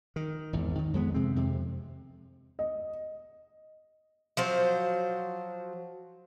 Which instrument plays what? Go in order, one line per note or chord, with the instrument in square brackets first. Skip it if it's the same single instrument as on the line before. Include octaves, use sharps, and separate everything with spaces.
[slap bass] D#3
G#1 E2
D#3
F2 G#3 B3
C3 G#3 C4
F2 C3
[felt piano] D#5
[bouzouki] F3 F#3 C5